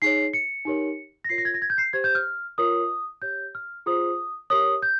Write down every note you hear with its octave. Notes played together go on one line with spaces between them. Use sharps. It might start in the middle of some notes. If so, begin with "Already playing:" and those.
D#4 G#4 C#5 C7
C#7
D#4 G4 A#4 C#5
A#6
F4 A#4 C#5 C7
A#6
G#6
A#6
G#6
G6
C7
G4 C5 G#6
G6
F6
F4 A#4 C#5 D#6
G4 C#5 G6
F6
F4 G#4 C5 D#6
G4 A#4 C#5 D#6
G6